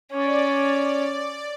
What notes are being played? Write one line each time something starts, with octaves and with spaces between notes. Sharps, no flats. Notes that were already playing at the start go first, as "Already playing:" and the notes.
C#4 D5